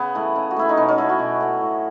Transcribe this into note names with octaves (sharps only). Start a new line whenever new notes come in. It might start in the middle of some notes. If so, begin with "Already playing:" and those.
Already playing: C#3 B3
E3 A3
C#3
F#4
E3 A3 E4
D#4
B2 C#4
C#4
F#3 A3 E4
F#4
B2
F#3 A3
A2